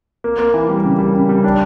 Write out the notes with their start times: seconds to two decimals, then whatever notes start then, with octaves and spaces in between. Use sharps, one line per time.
0.24 A#3
0.39 A#3
0.54 E3
0.69 G3
0.85 C#3
0.98 G3
1.14 C#3
1.29 G3
1.44 D4